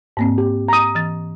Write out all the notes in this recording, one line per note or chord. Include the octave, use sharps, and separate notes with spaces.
G#2 A#3 C4
G4
A#5 D#6
E3 A6